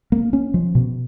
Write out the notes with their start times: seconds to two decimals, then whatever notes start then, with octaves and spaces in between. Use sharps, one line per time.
0.12 A#3
0.33 C#4
0.54 F3
0.75 B2